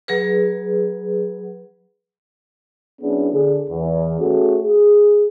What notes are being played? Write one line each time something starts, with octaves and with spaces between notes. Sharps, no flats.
F#3 G#4 B4
F#3 B3 C#4 D4 E4 G#4
D3 G#4
E2
A3 C#4 F#4 G#4 A4
G#4